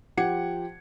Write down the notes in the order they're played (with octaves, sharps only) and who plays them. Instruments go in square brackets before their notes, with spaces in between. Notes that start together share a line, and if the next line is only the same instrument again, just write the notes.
[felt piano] F3 G4 C5 F#5 G#6 C#7